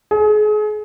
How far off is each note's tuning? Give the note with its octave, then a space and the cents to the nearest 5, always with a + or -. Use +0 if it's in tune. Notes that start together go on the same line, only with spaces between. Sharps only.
G#4 +35